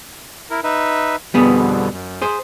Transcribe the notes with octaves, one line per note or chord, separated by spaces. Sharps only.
E4 A#4
D#4 B4 E5
F2 B2 D3 G3 B3 G#4
F#2
G#4 C5